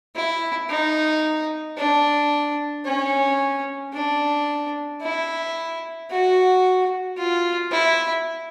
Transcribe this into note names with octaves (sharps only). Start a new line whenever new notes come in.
E4
D#4
D4
C#4
D4
E4
F#4
F4
E4